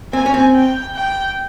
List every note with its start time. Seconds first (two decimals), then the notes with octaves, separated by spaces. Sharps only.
0.13 C4 G#5
0.26 C#4
0.34 C4
0.54 G5
0.95 G5